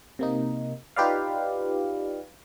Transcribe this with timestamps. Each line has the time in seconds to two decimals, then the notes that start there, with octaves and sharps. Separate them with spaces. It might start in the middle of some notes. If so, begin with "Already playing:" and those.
0.19 C3 A#3 D#4
0.96 D#4 F4 G4 B4 D5 F5